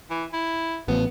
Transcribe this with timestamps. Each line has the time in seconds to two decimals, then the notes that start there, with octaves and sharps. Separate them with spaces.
0.11 E3
0.33 E4
0.88 A1 F3 B3